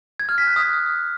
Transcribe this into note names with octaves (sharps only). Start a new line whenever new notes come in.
G#6
F6
B6
F#6
D#6